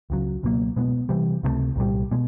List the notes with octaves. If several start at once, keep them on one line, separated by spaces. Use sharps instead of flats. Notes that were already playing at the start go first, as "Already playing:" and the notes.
C#2 C#3 F#3
C#2 B2 F#3 A#3
B2 G#3 B3
C3 E3 G3
C#2 C3 F3 A3
C2 A#2 G3
B2 G#3